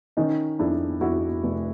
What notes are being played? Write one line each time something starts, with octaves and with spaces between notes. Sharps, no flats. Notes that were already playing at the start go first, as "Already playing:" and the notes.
D#3 C#4 D#4
F2 D4 E4
F2 E4 F#4
F1